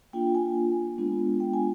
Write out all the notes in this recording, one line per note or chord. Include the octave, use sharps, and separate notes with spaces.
A#3 D4 F4 G5
G#5
G#3 B3 D4 F4
G5
G#5